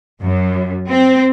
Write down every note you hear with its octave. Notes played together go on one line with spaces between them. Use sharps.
F#2
C4